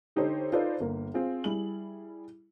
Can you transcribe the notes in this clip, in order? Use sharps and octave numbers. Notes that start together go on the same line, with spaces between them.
D3 D#4 G4 A4 C5 C#5
D#4 F4 A4 B4 C5 D5
G1 A#3
C4 F4 G#4
G3 E4 G#4 F#7